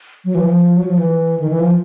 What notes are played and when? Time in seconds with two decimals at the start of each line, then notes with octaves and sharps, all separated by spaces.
0.25 F#3
0.35 E3
0.45 F3
0.77 F#3
0.87 F3
0.98 E3
1.40 D#3
1.50 E3
1.60 F3